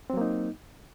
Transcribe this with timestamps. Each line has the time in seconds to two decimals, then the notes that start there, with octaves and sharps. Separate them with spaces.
0.10 C4
0.13 F#3
0.17 A#3
0.21 D#4